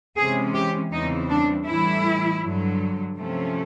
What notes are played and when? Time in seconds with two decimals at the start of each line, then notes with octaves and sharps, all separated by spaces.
0.17 C3 E3 G#3 C#4 G#4
0.54 G4
0.92 E2 C#3 E3 G3 C4 D#4
1.29 D4
1.67 A2 E3 G3 E4
2.42 G2 D3 F#3
3.17 C3 F3 A3 C#4